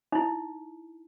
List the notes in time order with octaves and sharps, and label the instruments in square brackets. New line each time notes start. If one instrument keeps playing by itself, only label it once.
[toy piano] D#4 E4